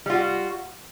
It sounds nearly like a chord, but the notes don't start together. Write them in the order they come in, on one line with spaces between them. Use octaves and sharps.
G3 F4 F#4